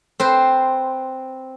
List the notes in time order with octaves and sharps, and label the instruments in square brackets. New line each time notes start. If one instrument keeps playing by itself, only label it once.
[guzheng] C4 B4 C5